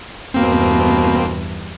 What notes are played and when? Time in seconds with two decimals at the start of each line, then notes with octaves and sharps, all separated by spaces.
0.34 E2 G2 B2 A#3 C4